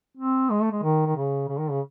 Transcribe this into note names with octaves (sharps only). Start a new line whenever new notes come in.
C4
G#3
A3
G#3
D#3
D#3
C#3
C#3
D#3
C#3